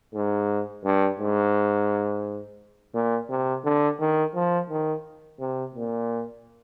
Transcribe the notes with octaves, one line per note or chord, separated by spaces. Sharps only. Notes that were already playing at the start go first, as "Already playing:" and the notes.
G#2
G2
G#2
A#2
C3
D3
D#3
F3
D#3
C3
A#2